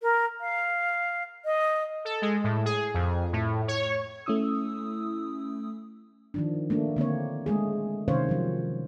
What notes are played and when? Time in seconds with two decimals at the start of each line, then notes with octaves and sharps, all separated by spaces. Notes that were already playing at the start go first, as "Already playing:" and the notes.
0.01 A#4
0.40 F5
1.44 D#5
2.05 A4
2.22 G#3
2.44 A2
2.65 G#4
2.94 F2
3.33 A2
3.68 C#5
4.26 A3 C#4 E4 D#6 E6
6.34 D#3 F3 D4
6.70 A3 A#3 D4
6.96 D3 A#3 C4 C#5
7.46 G#3 A3 G#4
8.08 C3 D#3 C#4 C5 C#5 F5
8.29 F3 F#3